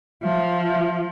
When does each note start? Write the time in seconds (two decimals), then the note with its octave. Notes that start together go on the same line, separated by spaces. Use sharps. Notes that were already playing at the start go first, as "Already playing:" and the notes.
0.23 F3 E5